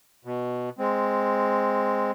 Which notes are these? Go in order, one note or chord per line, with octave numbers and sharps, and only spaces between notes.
B2
G#3 C4